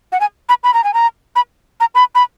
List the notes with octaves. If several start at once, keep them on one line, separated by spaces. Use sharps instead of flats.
F#5
G#5
B5
B5
A#5
G#5
A#5
B5
A#5
B5
B5